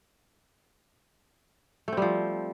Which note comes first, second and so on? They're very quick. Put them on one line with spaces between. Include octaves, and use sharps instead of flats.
A3 C4 G3 F3